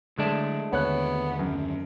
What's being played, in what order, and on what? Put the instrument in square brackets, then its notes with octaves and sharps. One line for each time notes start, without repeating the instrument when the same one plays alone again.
[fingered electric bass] D3 F#3 [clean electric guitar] G#3 A3 D4
[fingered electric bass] D#2 D3 C4 [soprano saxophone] B3 [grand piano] C#5 F#6
[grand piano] F#2